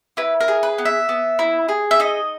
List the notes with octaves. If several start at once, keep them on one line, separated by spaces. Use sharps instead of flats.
E4 B4
A#4
G#4
B4
B3
E5
B3
E4
G#4
E5
D#4 D#5